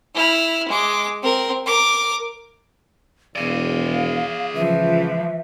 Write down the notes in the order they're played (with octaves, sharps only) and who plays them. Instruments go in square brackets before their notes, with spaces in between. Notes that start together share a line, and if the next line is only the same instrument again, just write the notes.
[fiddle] E4 F6
G#3 D6
C4 A#4
A#4 D6
[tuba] E1 [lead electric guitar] G#4 D5 [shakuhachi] F5
[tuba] C#2 [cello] E3 F3 [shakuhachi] E5